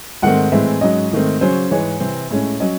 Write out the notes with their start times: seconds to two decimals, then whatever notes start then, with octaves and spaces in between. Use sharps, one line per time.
0.22 G#2 D#3 A3 C4 F#5
0.52 A2 E3 G#3 C4 E5
0.81 G#2 F#3 C#4 D#5
1.12 G#2 D#3 A3 C4
1.41 C#3 F#3 C#4 C5
1.71 G#2 E3 G#3 C#5
2.00 C3 E3 C4
2.31 A2 G#3 C#4
2.60 F#3 C#4 D#5